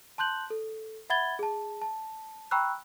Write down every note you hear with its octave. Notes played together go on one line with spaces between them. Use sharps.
A5 C6 F#6 G6 F#7
A4
E5 F#5 B5 G#6 A6 G7
G#4 A5
A5
G5 A#5 B5 C#6 E6 F#6